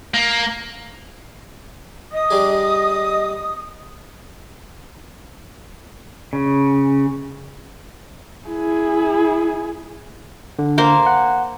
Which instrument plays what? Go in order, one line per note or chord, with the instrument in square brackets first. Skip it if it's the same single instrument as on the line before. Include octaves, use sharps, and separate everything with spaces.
[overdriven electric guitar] A#3
[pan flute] D#5 [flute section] D#6
[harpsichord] G3 D4 G#4
[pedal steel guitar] C#3
[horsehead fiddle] E4 G#4
[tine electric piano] D3
[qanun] A#3 A#4 C5
[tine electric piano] F#5